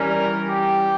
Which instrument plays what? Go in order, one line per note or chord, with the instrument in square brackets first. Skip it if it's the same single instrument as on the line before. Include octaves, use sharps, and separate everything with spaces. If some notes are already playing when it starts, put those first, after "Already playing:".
Already playing: [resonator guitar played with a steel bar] E3 G3 C#4 [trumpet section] A#4
[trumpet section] G4